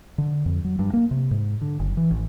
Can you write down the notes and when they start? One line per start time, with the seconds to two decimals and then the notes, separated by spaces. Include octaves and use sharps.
0.18 D3
0.46 F2
0.64 F#3
0.79 G2
0.93 A#3
1.11 C3
1.31 G#2
1.61 D3
1.80 F#1
1.97 E3
2.11 A1